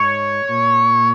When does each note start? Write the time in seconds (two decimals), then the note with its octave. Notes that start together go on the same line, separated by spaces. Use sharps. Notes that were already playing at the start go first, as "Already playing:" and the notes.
Already playing: G#2 C#5
0.45 A#2